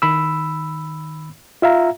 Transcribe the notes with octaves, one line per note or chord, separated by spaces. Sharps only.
D#3 B5 E6
F4 E5 F5 A#5